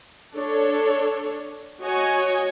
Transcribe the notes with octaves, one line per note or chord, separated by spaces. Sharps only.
D4 A4 C#5
F#4 C#5 D#5 G#5